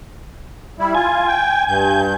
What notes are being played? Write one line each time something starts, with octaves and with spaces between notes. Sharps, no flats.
G3 E4
F4 G#5
G5
G2 G6